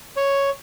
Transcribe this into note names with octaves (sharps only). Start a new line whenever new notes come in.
C#5